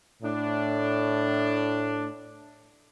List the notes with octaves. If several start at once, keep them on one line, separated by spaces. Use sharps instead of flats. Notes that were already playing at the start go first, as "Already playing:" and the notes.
A2 D4